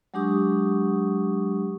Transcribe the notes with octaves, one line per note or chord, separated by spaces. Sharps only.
F#3 G#3 D4 G4 C#6 D#6